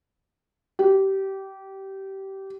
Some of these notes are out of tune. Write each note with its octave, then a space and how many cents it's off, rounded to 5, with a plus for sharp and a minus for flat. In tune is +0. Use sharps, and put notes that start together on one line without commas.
G4 -20